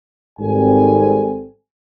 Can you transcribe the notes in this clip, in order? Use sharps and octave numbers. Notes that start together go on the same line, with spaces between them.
G#1 G#2 G3 C4 A4 G#5